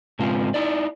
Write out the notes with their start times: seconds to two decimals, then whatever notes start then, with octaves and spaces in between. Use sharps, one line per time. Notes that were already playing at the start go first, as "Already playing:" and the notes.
0.19 G#2 C#3 G#3 C4 F4
0.54 D#4 E4 D5